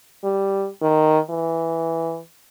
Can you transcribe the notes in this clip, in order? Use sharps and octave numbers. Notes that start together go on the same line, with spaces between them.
G3
D#3
E3